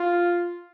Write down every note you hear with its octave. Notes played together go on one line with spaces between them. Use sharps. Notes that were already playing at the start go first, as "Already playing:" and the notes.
Already playing: F4